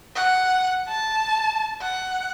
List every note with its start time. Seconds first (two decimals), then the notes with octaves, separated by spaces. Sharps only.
0.16 F#5
0.88 A5
1.81 F#5